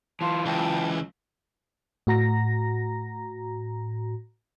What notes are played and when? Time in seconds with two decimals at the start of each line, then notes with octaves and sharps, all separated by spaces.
0.21 E3 F4 A5 C6
0.46 C#2 G5 A5
2.07 A2 F#4 A#5 A#6